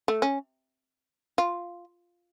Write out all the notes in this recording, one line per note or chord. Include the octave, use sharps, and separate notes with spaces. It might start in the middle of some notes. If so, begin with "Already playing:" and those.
A3
C#4
F4